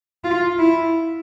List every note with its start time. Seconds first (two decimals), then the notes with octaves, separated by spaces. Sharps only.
0.24 F4
0.59 E4